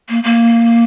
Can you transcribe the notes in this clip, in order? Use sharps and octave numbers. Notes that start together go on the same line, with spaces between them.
A#3
A#3